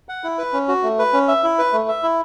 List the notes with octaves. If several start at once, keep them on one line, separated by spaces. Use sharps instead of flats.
F#5
E4
B4
C#4
F#4
A3
B4
C#4
E5
E4
B4
A3
E5
E4